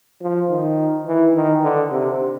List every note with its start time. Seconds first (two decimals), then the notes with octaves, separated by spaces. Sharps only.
0.21 F3
0.50 D#3
1.07 E3
1.34 D#3
1.63 D3
1.91 C3